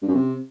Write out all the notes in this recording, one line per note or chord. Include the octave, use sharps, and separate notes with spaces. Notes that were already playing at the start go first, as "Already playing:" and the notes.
G2
F#2
C3